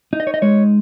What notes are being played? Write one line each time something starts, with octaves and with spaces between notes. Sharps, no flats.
D#4
D#5
C#5
D#5
G#3 C#5